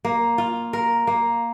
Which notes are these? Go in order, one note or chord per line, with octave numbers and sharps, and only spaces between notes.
A#3
F4
A#4
A#3